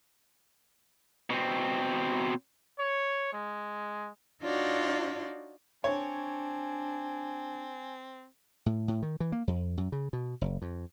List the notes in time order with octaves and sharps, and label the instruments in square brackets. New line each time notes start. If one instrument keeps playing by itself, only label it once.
[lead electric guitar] B2 C4
[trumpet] C#5
G#3
[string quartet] D4 D#4 F4 F#4 C#5 D5
[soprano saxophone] C4 [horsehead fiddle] D4 [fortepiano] C#5 [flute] G#5
[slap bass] A2
A2
D#3
E3
A#3
F2
F#2
C#3
B2
F#1
F2